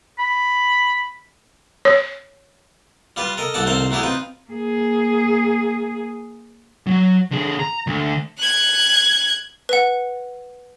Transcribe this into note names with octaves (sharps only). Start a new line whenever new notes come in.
B5
C#5
G3 F4 G4 B4
A4 A#4 D#5
C2 E3 A4 D5 F#5 A5
C2 D#3 C4 A4 C5 F5
F#3 A3 E4 G4 G#4
C4 D#4 F4 B4
A#3 G#4
F#3
D3 G#4
A#5
D2 D3
F#6 G#6
B4 F#5